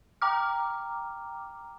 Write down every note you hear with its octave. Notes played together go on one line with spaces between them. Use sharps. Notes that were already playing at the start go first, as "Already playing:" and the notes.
G5 A#5 D6 F6